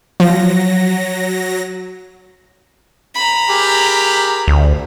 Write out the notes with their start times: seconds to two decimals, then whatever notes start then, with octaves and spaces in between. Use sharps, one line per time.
0.20 F3 F#3 A#6
3.15 A#5 B5
3.49 G4 G#4 A#4
4.48 D2